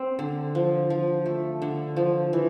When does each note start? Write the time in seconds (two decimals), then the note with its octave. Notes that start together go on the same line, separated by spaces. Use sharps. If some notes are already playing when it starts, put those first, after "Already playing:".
Already playing: C4
0.19 D3
0.55 F3
0.90 F3
1.26 A3
1.62 D3
1.96 F3
2.33 E3